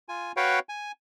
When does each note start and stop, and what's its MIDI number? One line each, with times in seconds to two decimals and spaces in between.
0.09 0.32 65
0.09 0.32 80
0.37 0.59 66
0.37 0.59 71
0.37 0.59 73
0.37 0.59 77
0.37 0.59 79
0.69 0.92 80